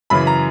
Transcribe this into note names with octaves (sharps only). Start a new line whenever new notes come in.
F#2 C#3 E3 B5
A#5